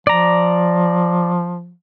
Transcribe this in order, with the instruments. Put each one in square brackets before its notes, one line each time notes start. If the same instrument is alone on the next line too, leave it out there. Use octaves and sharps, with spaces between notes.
[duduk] F3 [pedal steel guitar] D5 A#5